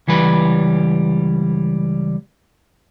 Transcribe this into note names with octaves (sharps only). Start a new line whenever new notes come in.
C#2 E3 G3 B4